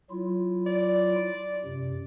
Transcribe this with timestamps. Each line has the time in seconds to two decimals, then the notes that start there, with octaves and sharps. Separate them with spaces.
0.10 F#3 E4 F4
0.66 D5
1.65 F#2 C3